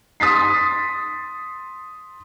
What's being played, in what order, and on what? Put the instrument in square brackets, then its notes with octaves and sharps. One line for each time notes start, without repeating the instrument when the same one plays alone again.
[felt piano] C6 D#6 A6 B6 C7